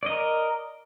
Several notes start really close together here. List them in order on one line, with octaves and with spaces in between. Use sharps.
D5 D#5 A#4